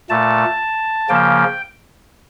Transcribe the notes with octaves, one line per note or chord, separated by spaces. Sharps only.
A#2 A3 A5
C#3 F3 A#3 G5